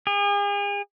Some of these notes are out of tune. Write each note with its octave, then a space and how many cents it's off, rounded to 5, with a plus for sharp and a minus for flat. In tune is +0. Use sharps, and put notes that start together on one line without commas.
G#4 -40